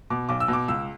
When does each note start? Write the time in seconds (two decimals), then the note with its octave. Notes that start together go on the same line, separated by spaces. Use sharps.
0.10 B2 D6
0.29 B1 D6
0.40 E6
0.48 B2
0.53 D6
0.68 C#2 E6